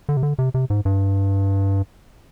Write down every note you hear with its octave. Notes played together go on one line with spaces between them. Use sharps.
D3
C3
D3
C3
C3
G#2
G2